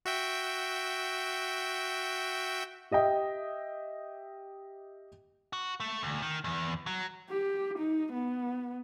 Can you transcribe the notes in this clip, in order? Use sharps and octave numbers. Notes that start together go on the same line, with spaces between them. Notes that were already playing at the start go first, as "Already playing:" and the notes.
F#4 E5 G5
G4 D#5 E5 G5
F#4
A3
D2
D#3
E2
F#3
G4
D#4
B3